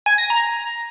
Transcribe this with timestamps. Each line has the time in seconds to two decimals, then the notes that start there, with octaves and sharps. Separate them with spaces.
0.06 G#5
0.18 A#6
0.30 A#5